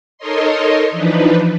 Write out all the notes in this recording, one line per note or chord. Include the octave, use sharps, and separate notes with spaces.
D#4 A4 A#4 C#5 D#5 C6
E3 F3 D4 D#4 B4